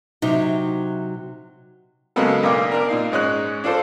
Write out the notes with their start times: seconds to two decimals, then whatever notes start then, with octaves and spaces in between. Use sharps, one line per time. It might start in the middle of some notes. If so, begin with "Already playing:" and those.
0.22 C3 F#3 D#4
2.16 C#3 F#3 G#3 A#3 B3 A4
2.43 B1 A#3 D4 D6
2.72 D4 A#4
2.89 A#2 D#4 F5
3.12 G#2 G#3 C#4 F#6
3.64 D4 F4 A4 C5